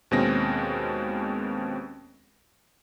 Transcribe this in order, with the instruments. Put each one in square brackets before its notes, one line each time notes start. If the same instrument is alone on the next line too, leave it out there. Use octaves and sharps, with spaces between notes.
[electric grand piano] D#2 B2 G#3 C4 C#4 A#6